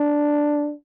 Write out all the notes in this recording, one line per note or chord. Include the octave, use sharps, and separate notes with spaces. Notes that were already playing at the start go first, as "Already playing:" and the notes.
Already playing: D4